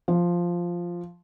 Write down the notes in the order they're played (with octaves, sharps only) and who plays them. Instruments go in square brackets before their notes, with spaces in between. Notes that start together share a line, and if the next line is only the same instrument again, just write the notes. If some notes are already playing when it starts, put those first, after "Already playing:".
[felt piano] F3